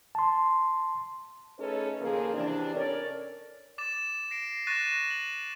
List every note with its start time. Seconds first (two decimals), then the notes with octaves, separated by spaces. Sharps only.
0.15 A5 C6
1.59 A3 C#4 D#4 G#4 A4 B4
2.01 D#2 C#3 F3 A#3 G#4 A#4
2.34 C3 E3 D4
2.76 C#4 A4 A#4 C#5 D5
3.78 D6 A6 E7
4.31 A#6 C7 D7
4.67 C#6 F#6 A6 A#6 D#7 E7
5.10 E7 F#7